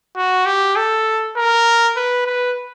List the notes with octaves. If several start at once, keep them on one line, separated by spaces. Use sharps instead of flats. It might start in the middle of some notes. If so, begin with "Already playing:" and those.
F#4
G4
A4
A#4
B4
B4